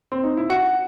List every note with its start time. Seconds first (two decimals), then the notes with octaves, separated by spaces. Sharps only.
0.12 C4
0.24 D#4
0.37 E4
0.50 F#4 F#5